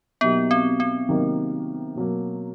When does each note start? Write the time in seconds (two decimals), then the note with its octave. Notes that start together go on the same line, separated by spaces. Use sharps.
0.21 B2 F#3 A#3 B3 D#4 G4
0.51 C4
0.80 C4
1.09 C3 D#3 F#3 A#3 D#4
1.95 B2 F#3 A#3